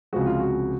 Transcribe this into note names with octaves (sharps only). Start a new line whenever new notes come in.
C#2 C3 F3 G#3 F#4
F4
F#4